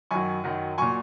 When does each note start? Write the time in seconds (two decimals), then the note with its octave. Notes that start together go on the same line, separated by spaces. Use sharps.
0.11 F#2 D#3 F#3 G#5 C#6
0.44 F#2 D#3 F#3
0.78 A#2 F#3 G#5 C#6